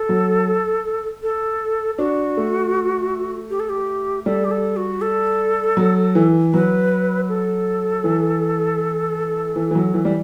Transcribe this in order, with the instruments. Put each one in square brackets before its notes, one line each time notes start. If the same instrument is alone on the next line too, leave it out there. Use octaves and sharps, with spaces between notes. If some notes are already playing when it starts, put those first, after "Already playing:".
Already playing: [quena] A4
[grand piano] F#3
[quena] A4
[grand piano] D4 [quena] F#4
[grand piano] A3
[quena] G4
A4
G4
[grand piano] G3 [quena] A4
[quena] G4
A4
F#4
A4
[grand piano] F#3
E3
[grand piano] F#3 [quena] B4
[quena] A4
[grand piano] E3
E3
E3
F#3
E3
G3